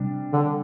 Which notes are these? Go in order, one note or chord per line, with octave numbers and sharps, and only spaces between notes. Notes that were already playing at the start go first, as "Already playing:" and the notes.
Already playing: C3 G3 D4
D3